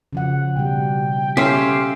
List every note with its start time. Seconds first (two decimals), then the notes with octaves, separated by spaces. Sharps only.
0.13 C#3 F3 F#5
0.56 B2 G3 G5
1.37 C#4 G4 A4 C5 E5 F5